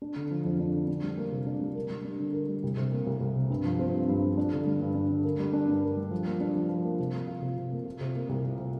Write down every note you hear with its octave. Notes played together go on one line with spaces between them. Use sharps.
D4
D3
F3
F2
D4
D3
D4
G3
A#3
C3
D4
G3
A#4
G3
D4
D3
A#4
G3
C2
C3
A#3
C2
C2
C3
G2
F3
C4
G2
G2
F3
D4
D3
G3
G2
D4
D3
A#4
G3
D4
G2
A#4
G3
F3
A#3
D4
F3
F3
A#3
C3
A#3
F4
C3
C3
A#3
F4
C3
A#3
C2
F4
C3